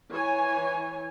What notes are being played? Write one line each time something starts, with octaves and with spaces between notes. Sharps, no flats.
E3 C#5 G#5